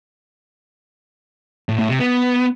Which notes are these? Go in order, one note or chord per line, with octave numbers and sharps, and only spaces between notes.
A2
A2
C3
B3